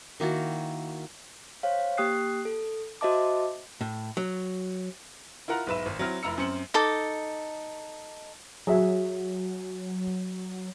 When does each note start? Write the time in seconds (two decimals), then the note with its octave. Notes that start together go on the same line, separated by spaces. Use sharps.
0.20 D#3 A#3 E4 F#4
1.63 C5 C#5 F5
1.98 A#3 G4 G5 D#6 F#6 C7
2.45 A4
3.01 F#4 C5 D#5 E5 A5 D6
3.81 A2
4.17 F#3
5.48 E4 F4 A#4 F#5 A#5
5.67 B1 G#2 B4 E5 E7
5.86 G#1
5.99 F#3 C4 E4 F6 A#6
6.23 F1 E4 A#5 E6 C#7
6.38 F#2 C4 C5 C#7 F#7
6.74 D#4 A4 D6
8.67 F#3 F#4 G#4 E5